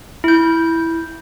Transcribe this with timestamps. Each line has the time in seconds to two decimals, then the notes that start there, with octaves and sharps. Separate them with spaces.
0.24 E4 G6